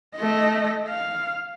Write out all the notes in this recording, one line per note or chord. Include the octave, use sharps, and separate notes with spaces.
A3 D#5
F5